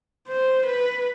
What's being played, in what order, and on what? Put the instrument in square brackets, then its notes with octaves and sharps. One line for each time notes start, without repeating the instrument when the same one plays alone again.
[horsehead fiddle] C5
B4